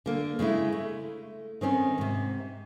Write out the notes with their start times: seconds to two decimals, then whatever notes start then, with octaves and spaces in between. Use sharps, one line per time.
0.06 D3 A#3
0.39 C#3 G#3 A3 E4
0.72 A3
1.61 D#3 C4 C#4 D#4
1.98 G#2 C3